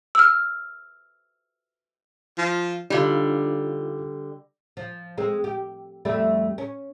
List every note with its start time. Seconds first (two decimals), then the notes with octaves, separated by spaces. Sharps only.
0.15 E6 F6
2.38 F3
2.90 D3 G3 D#4 F4
4.77 F3
5.18 G#3 C4 A4
5.44 G4
6.05 F2 G3 A3
6.58 C#4